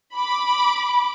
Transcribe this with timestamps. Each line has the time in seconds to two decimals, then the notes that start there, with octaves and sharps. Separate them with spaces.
0.15 B5 D6